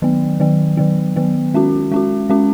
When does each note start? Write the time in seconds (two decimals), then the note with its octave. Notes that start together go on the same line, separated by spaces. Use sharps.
0.02 D#3 F#3 B3
0.40 D#3 F#3 B3
0.77 D#3 F#3 B3
1.16 D#3 F#3 B3
1.54 G#3 C#4 F#4
1.91 G#3 C#4 F#4
2.29 G#3 C#4 F#4